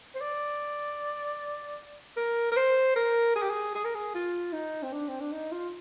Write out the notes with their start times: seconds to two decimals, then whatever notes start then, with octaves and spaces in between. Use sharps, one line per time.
0.15 C5
0.21 D5
2.17 A#4
2.52 A#4
2.56 C5
2.96 A#4
3.35 G#4
3.42 G4
3.50 G#4
3.75 G#4
3.84 A#4
3.95 G#4
4.15 F4
4.53 D#4
4.83 C4
4.92 D4
5.08 C4
5.20 D4
5.32 D#4
5.52 F4